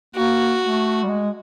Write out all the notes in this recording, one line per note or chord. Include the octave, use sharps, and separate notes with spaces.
A#3 F#4
A3
G3
G#3